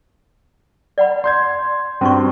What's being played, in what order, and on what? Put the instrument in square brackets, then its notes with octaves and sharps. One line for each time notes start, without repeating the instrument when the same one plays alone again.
[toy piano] D5 F#5 B5
[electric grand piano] C6 G6 G#6
[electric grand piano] G2 C4 [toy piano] C#4 F#4 C#6